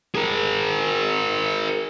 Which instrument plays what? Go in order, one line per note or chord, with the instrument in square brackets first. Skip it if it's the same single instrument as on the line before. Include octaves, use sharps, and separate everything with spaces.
[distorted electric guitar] G#4 A#4